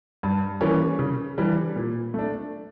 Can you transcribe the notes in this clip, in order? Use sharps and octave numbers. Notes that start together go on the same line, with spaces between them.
G2
E3 G3 A#3 C#4
C#3
E3 G3 D4
A#2
A3 D4